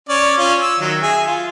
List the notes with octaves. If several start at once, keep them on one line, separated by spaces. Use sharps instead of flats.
C#4 C#5 D5
C#4 F4
E6
D#3 F#3
G#4 E5
F4